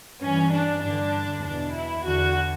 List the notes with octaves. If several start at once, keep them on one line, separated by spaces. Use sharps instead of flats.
G2 E3 C#4
D4
G2 D3 D4
E2 B2 D4
E4
E2 D3 F#4